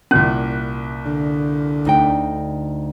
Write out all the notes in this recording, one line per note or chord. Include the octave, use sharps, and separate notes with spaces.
C2 A#2 C#4 F#6
D3
D2 D#4 G5